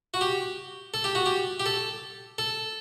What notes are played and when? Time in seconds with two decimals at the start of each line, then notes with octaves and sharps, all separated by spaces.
0.14 F#4
0.21 G4
0.94 A4
1.04 G4
1.15 F#4
1.26 G4
1.60 G4
1.66 A4
2.38 A4